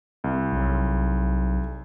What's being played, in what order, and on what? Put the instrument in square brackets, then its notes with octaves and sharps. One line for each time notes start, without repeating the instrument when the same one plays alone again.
[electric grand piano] C2
[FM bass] B1